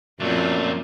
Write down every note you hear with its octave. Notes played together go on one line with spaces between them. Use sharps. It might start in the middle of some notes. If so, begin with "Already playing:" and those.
F#2 A#2 F3 F#3 A3 C4 F4 D5